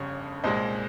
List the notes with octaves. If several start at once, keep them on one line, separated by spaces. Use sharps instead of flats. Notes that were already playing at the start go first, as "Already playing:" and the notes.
Already playing: G1 F2 C#3 G3 C#5
C2 A#2 G#3 C5 D#5